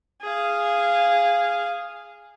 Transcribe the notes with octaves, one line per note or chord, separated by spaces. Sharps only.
G#4 F5